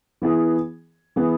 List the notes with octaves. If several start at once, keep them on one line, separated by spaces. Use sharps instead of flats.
E3 B3 E4 G#4
E3 B3 E4 G#4